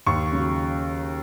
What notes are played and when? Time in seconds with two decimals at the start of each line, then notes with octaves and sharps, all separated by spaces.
0.06 D#2 C#6
0.32 C#3 F#3